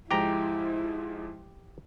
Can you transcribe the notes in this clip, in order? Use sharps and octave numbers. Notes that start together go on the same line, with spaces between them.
G#2 F3 G#3 E4 G4 G5 A#5